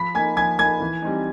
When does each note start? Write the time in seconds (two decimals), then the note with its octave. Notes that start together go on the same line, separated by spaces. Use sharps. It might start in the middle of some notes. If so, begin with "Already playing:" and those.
Already playing: F3 B5 B6
0.15 A#3 D#4 G#5 G#6
0.37 F3 G#5 G#6
0.59 A#3 D#4 G#5 G#6
0.81 E3
1.02 G3 C4 D#4